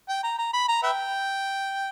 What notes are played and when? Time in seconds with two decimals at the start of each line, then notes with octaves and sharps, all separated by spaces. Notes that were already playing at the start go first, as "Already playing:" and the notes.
0.09 G5
0.23 A#5
0.38 A#5
0.53 B5
0.68 A#5
0.83 B4 E5 G5